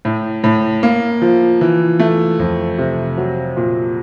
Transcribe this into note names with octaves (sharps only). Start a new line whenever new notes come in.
A2
A2
A#3
F3
E3
A3
F2
C3
F#3
A#2